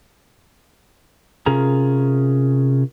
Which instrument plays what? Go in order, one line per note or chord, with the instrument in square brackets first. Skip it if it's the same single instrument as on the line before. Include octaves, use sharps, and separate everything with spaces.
[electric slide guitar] C3 C#4 F4 G#4 A#4 A#5